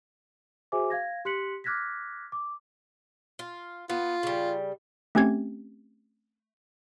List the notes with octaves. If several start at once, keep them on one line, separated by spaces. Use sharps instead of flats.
F#4 G#4 C5 E5 G#5 D6
F5 G#6 A#6
G4 C6 F#6 B6 C#7 F#7
D6 F6 F#6 G#6 A#6 B6
D6
F4
B3 F4
C#3 G3
A3 C4 C#4 G4 G#6